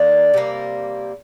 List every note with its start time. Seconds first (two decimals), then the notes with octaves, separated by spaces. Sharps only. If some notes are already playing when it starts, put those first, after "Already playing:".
Already playing: D#3 A#3 D4
0.34 C3 G3 A#3